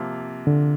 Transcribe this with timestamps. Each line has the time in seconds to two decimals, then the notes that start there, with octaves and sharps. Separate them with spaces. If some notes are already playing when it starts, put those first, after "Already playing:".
Already playing: C3 F3 A#3
0.47 D3